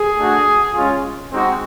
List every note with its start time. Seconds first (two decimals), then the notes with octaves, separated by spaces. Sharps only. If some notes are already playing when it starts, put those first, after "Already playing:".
Already playing: G#4
0.18 A3 D4 F#4
0.74 G#3 C#4 F4
1.31 G#3 C4 D#4 F#4